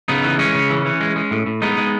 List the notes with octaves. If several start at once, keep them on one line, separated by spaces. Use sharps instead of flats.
C#3 B3 D#4
E3
G#3 C#4
C#3
E3
E3
G#3
G#3
A2
A2
G#3 B3 D#4
G#3